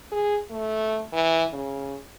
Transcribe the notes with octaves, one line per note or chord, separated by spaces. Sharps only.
G#4
A3
E3
C#3